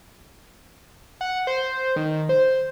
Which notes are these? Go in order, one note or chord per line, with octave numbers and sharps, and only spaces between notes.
F#5
C5
D#3
C5